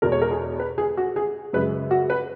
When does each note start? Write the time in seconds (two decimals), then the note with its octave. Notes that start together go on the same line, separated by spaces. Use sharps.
0.02 E2 B2 G#3 A#4
0.12 C#5
0.21 A#4
0.31 G#4
0.60 B4
0.78 G#4
0.97 F#4
1.16 G#4
1.53 F#2 C#3 G#3 B4
1.91 F#4
2.10 B4